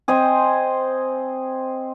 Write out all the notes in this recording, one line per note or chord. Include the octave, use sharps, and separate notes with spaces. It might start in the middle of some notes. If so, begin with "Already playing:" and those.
C4 C5 D#5 G#5